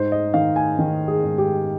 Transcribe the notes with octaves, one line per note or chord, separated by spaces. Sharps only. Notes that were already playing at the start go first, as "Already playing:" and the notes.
Already playing: G#2 C5
D#5
D#3 F5
G#5
D#3
G#4
G#2
G4